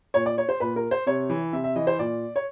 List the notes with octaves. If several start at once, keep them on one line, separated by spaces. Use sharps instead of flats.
A#2 C#5
D5
C#5
C5
A#2 B4
A#4
C5
C3 C#5
E3
C3 E5
E5
E3 D#5
C5
A#2 D5
C#5